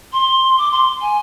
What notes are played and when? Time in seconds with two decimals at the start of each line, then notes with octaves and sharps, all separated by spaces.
0.13 C6
0.58 D6
0.71 C6
1.01 G#5